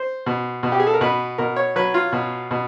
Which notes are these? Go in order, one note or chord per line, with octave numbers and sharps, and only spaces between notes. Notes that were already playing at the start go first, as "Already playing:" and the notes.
Already playing: C5
B2
B2
G4
G#4
A4
A#4
B2 B4
B2 A#4
C#5
F#3 B4
F4
B2
B2